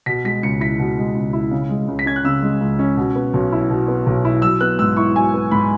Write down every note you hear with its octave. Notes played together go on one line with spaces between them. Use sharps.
B2 B6
G#3 B6
C#2 C#7
E4 B6
B2
G#3
C#2
E4
C#3
G#3
C#2
B6
C#4 G#6
F#6
C#3 E6
G#3
C#2
C#4
B2
B3
B1
E4
B2
B3
B1
E4
F#3 E6
B3 F#6
G#2 E6
E4 C#6
F#3 G#5
B3
G#2 B5